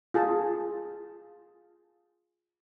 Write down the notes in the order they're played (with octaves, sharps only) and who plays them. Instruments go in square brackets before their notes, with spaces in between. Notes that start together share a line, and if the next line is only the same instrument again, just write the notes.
[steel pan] F4 G#4 A5